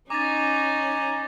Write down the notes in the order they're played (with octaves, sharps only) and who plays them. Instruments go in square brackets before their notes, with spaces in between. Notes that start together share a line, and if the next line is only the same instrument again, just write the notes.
[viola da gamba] C#4 D#4 [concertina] G#5 A#5 [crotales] D6 A6